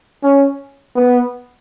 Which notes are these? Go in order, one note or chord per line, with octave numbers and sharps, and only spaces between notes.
C#4
B3